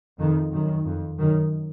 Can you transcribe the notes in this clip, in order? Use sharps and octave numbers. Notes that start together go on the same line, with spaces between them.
F2 D#3
F#2 D#3
F2
F#2 D#3